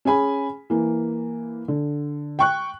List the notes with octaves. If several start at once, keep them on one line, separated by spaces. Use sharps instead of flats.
C#4 G#4 G#5 B5
E3 A#3
D3
G5 C#6 F#6